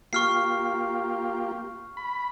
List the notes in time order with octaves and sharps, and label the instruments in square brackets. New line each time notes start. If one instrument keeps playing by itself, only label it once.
[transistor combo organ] A#3 F4 G4 [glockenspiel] C#6 F6 C7
[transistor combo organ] B5